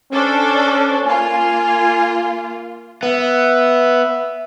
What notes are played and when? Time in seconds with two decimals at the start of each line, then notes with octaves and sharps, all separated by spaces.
0.13 C#4 D4 A4 C5
1.04 A#3 F4 G#5
3.03 B3 E5